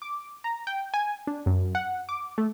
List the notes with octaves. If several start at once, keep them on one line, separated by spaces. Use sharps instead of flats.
D6
A#5
G5
G#5
D4
F#2
F#5
D6
A3